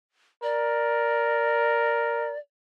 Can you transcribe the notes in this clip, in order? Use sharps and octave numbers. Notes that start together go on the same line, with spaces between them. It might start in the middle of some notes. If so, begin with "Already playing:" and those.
A#4 D5